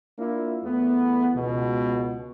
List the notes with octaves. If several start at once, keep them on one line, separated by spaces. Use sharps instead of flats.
A#3 D4 E4 F4
E2 A3 B3
C#2 B2